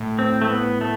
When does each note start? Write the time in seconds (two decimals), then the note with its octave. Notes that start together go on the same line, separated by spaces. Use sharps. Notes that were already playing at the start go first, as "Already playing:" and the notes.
Already playing: A2
0.19 C4
0.42 A3
0.49 B3
0.81 A3